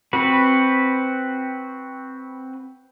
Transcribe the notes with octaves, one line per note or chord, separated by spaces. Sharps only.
C4 F#4 B4